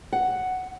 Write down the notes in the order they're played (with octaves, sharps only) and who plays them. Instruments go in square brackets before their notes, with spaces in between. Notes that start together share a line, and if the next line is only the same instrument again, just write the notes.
[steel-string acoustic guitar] F#5